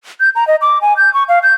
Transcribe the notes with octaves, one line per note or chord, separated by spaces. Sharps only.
G6
A#5
D#5
D6
G#5
G6
C#6
F5
G6